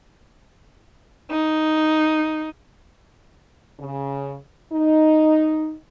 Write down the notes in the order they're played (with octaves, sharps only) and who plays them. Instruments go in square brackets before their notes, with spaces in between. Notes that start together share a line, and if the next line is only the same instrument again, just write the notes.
[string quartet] D#4
[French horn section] C#3
D#4